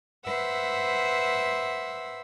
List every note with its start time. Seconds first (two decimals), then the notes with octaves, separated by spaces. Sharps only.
0.24 B4 C5 E5 F#5 E6